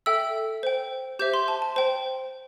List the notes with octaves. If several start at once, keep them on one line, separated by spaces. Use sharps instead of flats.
A4 E5 G5 E6
C5 G5
G4 C5 E5 G6
C6
A5
A5
C5 G5